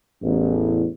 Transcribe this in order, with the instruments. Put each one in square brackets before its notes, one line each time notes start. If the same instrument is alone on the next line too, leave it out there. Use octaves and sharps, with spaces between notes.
[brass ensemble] A1 E2